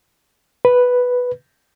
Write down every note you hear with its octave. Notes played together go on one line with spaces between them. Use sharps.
B4